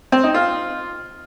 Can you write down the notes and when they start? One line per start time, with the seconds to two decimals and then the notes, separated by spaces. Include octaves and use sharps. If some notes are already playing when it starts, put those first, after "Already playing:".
0.12 C4
0.23 D#4
0.34 F4